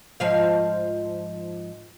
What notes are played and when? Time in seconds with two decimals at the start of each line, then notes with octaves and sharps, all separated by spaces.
0.20 G#2 F3 F5